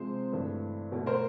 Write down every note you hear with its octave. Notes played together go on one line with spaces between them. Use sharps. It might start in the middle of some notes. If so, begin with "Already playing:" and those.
Already playing: C3 F3 G#3 C5
G2 E3 A3
B2 F#3 A3
A#4 C5